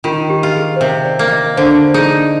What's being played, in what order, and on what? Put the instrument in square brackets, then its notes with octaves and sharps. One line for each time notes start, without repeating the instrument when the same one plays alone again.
[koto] D#3 [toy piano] F4
[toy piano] G4
[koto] F4
[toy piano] G#4
C5
[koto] C3 [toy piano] A#4
[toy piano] D5
[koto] A#3
[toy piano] D#5
[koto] D3 [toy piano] C5
[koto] D#4 [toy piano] G#4